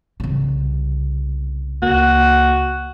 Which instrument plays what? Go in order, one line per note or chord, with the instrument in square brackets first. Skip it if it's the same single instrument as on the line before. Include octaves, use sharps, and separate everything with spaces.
[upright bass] C2 C#3
[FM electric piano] C#2 A#3 [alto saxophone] F#4